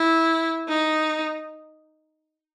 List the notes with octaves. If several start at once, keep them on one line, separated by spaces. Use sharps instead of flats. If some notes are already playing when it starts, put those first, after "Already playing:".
Already playing: E4
D#4